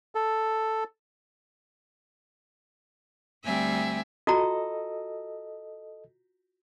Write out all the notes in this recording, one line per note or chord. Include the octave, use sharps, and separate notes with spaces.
A4
D2 G3 C4 E5 G#5
F4 F#4 A4 D#5 A#5